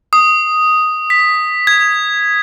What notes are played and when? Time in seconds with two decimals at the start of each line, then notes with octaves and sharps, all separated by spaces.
0.13 D#6
1.10 B6
1.67 G#6